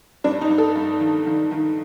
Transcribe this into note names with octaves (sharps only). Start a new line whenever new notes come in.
G2 D4
D#4
G2
A4
G2
D#3
D#3
D#3